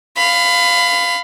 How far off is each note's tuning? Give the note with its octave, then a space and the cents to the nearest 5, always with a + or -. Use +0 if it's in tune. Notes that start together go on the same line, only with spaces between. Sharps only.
F5 +0 B5 +25